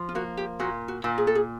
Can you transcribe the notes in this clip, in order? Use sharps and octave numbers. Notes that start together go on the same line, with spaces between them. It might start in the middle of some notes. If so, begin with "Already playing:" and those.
Already playing: F3
F4
A#3 F#4
G4
A#2 F#4
F#4
A#2
G#4
A4
G#4